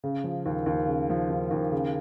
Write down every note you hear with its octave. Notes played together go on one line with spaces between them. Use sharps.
C#3
F3
D#2
D#2
C#3
F3
D#2
D#2
C#3